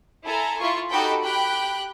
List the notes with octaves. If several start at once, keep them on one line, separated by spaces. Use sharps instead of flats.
E4 A4 G#5 A#5
E4 F4 C#6
D#4 F#4 G4 A4 G5 B5
G4 G5 B5 F#6